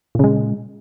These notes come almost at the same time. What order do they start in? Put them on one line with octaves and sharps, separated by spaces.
A#2 C#3 G#3